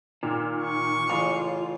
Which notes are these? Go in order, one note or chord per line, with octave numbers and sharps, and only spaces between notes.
A#2 D#3
C#6
A1 C#3 F4